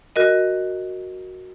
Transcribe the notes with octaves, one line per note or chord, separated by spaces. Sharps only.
F#4 A#4 D#5